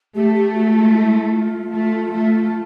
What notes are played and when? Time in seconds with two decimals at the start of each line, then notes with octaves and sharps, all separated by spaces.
0.15 A3 G4
0.35 G4
0.54 F#4
0.74 F4
0.94 E4
1.32 F4
1.71 A3
2.11 A3